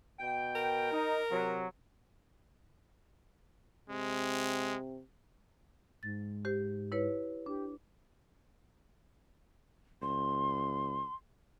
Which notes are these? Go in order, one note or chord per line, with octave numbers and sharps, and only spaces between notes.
B2 G5
A#4
D#4
C3 F#3
C3 G#3
G#2 A6
G4 C5
E4 B4 C#5
D4 G4
C#2 C6